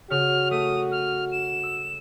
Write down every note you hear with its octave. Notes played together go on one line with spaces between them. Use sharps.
C#3 F#4 F6
A3 D#6
F6
E7
E6